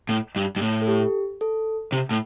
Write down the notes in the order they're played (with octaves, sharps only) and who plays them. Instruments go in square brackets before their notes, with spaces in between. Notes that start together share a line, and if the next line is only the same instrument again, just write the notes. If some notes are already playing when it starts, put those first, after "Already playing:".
[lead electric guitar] A2
G2
G2
A2
[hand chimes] A4
G4
A4
[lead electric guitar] C3
A2